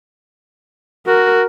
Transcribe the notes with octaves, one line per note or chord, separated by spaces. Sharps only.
F#4 A#4